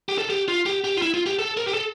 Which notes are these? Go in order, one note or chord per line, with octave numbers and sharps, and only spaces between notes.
G4
A4
G4
F4
G4
G4
F4
E4
F4
G4
A4
A#4
G4
A4